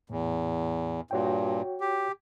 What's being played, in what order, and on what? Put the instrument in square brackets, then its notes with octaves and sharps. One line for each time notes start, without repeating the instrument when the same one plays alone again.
[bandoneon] E2 [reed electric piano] A2
[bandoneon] G2 A#2 [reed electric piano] F#4 C#5 G5
[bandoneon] G4